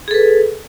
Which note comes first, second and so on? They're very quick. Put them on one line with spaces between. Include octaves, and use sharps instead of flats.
G#4 A4 B4